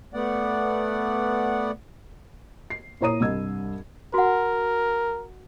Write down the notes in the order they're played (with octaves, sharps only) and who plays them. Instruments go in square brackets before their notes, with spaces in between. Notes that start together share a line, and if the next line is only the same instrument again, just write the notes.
[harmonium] A3 B3 D5 F#5
[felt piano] C7
A#2 E4 C#5 A#5 D#6 D#7
C2 G2 D#5 E6 G#6
[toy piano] F#4 F#5 [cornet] A#4